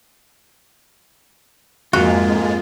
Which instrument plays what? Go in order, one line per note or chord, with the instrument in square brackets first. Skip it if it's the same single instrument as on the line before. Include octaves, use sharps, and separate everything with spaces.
[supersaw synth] F2 G#3 [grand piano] G#2 A#3 [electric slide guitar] F4 [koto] F#4